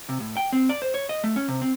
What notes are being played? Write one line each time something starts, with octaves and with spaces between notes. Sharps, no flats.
C3
A2
G5
C4
D5
C5
C#5
D#5
A3
C#4
C3
C4